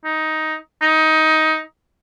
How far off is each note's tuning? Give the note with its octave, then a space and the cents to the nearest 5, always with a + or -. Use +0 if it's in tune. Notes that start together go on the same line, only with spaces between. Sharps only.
D#4 +10
D#4 +15